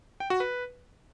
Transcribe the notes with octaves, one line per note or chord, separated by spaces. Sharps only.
G5
F#4
B4